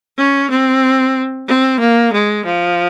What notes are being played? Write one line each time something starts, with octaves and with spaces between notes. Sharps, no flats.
C#4
C4
C4
A#3
G#3
F3